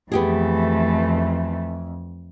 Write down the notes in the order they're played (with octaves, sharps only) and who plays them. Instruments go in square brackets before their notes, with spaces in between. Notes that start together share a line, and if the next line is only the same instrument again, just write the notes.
[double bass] F2 [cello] E3 A3 [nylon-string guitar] B3 G4 G#4